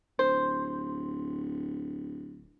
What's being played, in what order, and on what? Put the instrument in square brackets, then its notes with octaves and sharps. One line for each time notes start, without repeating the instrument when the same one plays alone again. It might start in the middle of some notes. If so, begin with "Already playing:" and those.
[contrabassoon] D1 [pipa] C5